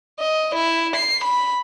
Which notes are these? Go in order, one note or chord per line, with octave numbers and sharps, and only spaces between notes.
D#5
E4
C7
B5